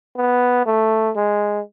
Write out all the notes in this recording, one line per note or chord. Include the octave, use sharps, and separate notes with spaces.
B3
A3
G#3